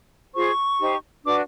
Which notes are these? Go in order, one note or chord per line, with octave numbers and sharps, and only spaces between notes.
F4 G#4 C5 C#6
D#4 G4 C5
D4 F#4 B4 D6